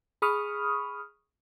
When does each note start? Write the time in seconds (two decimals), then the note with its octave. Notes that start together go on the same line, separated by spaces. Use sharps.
0.22 G#4 B5 C#6 D#6 F6